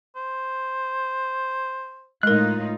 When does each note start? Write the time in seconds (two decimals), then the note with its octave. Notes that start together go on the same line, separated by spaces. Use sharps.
0.16 C5
2.23 A2 G#3 D#4 F4 A#4 F#6